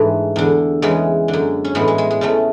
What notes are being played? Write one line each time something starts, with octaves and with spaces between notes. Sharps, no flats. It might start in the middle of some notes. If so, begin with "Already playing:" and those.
Already playing: G#2 E3 A3 D4 E4
E2 D3
E2 C#3 E3 G#3
D3
F#2
C#4
A2 E3 G#3 B3
G#3
G#3
G#3
E2 C#3 E3 A3